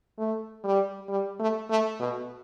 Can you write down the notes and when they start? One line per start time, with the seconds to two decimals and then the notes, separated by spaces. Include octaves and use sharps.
0.18 A3
0.64 G3
1.09 G3
1.39 A3
1.70 A3
2.00 B2